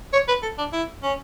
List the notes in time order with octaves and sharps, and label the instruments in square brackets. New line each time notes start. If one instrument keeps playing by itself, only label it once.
[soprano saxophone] C#5
B4
A4
D4
E4
C#4